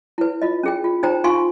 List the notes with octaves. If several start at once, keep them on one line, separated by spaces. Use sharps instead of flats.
E4 B4
F4 D#5
C#4 G#4 G5
F4
D#4 C5 G5 A#5
D#4 F4 F5 G#5 C6 C#6